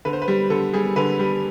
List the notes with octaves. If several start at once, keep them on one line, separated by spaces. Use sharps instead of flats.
D3 B4
C5
B4
G3
D3 A4
G3 G#4
D3 B4
G3